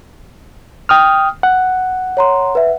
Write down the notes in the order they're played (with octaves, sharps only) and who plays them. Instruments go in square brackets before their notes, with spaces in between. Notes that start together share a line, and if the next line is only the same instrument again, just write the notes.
[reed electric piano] G5 D#6 F6
F#5
[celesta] C#5 A#5 C6
B4 E5